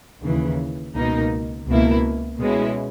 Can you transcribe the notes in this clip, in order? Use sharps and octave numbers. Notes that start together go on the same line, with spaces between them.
D#2 C#3 E3
C#2 B2 A#3 D#4
C#2 B2 A#3 E4
B2 G#3 C#4 E4